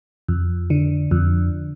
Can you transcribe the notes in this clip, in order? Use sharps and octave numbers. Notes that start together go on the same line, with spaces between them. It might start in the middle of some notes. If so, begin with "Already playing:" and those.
F2
D3
F2